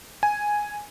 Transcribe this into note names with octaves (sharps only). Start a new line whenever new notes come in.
G#5